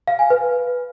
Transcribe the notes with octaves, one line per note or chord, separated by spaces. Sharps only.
F5
G#5
B4